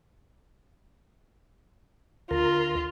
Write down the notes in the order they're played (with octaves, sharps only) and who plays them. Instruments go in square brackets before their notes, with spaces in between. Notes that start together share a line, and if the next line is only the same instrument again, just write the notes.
[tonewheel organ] D2 A#4 [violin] F4